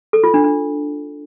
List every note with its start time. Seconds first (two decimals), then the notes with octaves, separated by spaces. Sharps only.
0.13 A4
0.24 F4
0.34 D4
0.44 D4